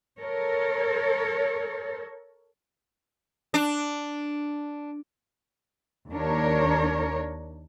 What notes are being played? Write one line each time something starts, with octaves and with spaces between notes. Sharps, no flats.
A4 A#4 C#5
D4
D#2 D4 A#4 C#5